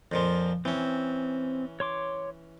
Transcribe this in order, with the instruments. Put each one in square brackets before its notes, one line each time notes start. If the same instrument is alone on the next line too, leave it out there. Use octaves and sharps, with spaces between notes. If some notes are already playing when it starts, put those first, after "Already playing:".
[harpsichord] F2 A#2 F3
[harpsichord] E3 C#4 [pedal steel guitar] C4
[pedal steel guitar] C#5 C6 D6